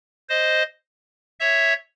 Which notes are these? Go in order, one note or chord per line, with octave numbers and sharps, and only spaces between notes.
C5 D#5
C#5 E5